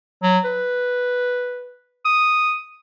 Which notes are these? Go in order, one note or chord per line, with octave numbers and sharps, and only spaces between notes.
F#3
B4
D#6